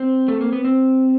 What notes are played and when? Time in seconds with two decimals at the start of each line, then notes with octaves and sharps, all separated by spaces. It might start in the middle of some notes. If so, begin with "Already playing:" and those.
Already playing: C4
0.28 A3
0.41 A#3
0.53 B3
0.64 C4